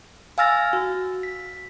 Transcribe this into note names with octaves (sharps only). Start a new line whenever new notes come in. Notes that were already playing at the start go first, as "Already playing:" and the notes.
F5 G#5 E6 F6 A6 A#6
F#4
B6